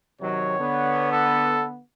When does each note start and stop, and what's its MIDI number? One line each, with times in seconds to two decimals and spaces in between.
0.21 0.57 48
0.21 0.57 51
0.21 0.57 54
0.21 1.11 73
0.58 1.79 50
0.58 1.79 59
1.12 1.66 69